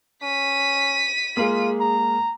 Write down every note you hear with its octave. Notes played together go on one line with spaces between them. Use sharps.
C#4 B6 D#7
G#3 A#3 F4 G#4
A#5